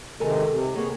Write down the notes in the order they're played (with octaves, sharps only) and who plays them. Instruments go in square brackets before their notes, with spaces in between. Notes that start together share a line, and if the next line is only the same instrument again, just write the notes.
[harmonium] C3 D#3 G#3 [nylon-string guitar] A4 A#4 G#5
[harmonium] C3
[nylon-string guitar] A#3 B3 [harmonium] G#4 C#5